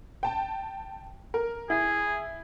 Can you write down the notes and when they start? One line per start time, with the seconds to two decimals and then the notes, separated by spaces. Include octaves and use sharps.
0.23 G5 A5
1.34 A#4
1.70 E4 G#4